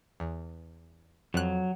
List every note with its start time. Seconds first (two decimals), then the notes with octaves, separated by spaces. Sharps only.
0.20 E2
1.34 F2 F#3 F#6